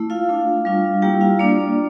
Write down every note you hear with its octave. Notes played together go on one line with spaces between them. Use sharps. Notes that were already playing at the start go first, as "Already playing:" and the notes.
Already playing: A3 E4
F4 F5
A3 D4 F4
G3 D4 F4
G3 A#3 E4 G4 G5
F4 F5
A#3 D4 F4 D5